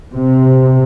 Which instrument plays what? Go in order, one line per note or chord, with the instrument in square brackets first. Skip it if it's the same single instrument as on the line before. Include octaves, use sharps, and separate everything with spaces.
[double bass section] C3